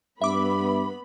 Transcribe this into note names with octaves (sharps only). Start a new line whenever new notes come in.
G2 B3 E5 B5 D6